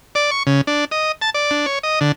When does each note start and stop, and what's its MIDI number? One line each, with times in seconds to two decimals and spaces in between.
0.15 0.31 74
0.31 0.43 85
0.47 0.61 49
0.67 0.85 62
0.91 1.12 75
1.22 1.30 81
1.34 1.51 74
1.51 1.66 62
1.66 1.79 73
1.83 1.99 75
2.01 2.12 50